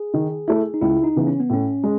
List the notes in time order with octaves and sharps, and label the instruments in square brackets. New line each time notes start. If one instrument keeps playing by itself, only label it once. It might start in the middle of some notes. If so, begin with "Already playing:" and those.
Already playing: [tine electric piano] G#4
[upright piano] D#3
A3 E4
[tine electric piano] D#4
[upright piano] C#2 [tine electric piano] E4
[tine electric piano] D#4
[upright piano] C#3 E3 B3
[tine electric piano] C#4
B3
[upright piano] A2 [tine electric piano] C#4
[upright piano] G#3